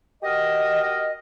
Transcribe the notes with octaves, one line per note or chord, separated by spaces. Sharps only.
F#4 G4 A#4 D#5